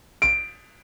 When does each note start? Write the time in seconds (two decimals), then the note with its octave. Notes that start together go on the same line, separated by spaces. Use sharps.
0.22 D7